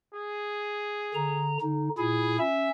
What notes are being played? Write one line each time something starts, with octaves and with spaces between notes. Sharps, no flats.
G#4
D3 A#5
D3 D#4
A#2 E4 G#4
C#4 E5